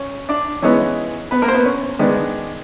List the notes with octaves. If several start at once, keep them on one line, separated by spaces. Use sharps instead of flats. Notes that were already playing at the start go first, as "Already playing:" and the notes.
Already playing: C#4 C#5
D4 D5
E3 G#3 B3 C#4 D#4 C#5
B3 B4
A#3 A#4
C5
B3 B4
C#4 C#5
D#3 G#3 B3 D4